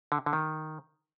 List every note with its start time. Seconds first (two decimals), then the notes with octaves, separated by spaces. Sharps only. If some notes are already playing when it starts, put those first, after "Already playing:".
0.12 D3
0.26 D3
0.33 D#3